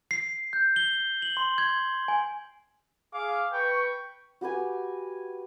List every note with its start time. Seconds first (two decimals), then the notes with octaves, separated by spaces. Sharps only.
0.11 C7
0.53 G6
0.76 G7
1.22 F#7
1.37 C6
1.58 G#6
2.08 G#5
3.14 G#4 F5 D6
3.53 B4 G5 C#6
4.41 F#4 G4 B4 G#5